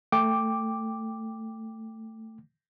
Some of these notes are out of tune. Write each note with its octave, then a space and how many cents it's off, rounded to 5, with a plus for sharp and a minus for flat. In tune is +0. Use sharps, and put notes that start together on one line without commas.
A3 +15 G5 +10 D6 +0